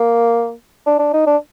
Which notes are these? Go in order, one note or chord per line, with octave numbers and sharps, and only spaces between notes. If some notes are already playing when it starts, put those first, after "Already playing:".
Already playing: A#3
D4
D4
D#4
D4